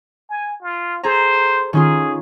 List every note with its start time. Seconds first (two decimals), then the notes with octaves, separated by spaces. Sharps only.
0.30 G#5
0.62 F4
1.04 G#4 A4 C5 A#5
1.73 D#3 C#4 F4 G#4